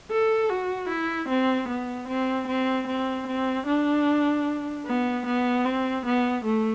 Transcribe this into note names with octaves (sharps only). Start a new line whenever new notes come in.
A4
F#4
E4
C4
B3
C4
C4
C4
C4
D4
B3
B3
C4
B3
A3